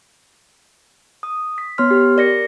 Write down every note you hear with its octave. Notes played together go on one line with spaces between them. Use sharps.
D#6
B6
B3 C#5 C6 F6
G4
A#4 D5 A#6 C#7